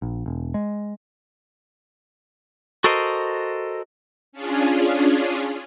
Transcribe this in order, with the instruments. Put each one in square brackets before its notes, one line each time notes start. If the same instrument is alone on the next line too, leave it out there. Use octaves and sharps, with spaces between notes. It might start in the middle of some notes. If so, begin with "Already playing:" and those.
[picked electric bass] A#1
E1
G#3
[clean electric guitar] F#4 A4 A#4 C5 D#5
[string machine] C#4 D4 F4 G#4